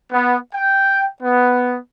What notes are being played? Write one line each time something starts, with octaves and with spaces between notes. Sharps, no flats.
B3
G5
B3